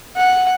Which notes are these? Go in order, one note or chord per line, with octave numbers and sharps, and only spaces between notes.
F#5